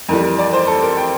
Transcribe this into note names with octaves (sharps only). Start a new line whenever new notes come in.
F2 E3 G3 A#4
A#4
D5
C5
A4
A#4
G5